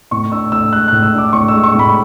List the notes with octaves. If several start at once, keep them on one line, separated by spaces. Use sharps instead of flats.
A2 C#6
D4 E6
A2 E6
G#3 F#6
A2 F#6
E6
D4 D6
A2 C#6
E6
G#3
C#6
A2
B5